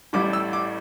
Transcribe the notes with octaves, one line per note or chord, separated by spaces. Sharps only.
A1 A2 G3 D6
E6
D6